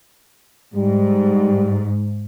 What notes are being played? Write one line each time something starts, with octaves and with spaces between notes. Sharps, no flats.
G#2 G3